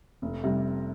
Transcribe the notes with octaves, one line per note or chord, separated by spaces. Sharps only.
F1
C3 G3